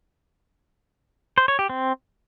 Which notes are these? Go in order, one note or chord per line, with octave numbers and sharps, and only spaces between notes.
C5
C#5
G4
C4